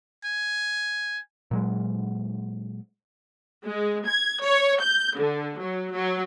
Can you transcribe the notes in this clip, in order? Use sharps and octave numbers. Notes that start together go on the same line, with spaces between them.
G#5
A#2 F#3 G#3
G#3
G#6
C#5
G6
D3
F#3
F#3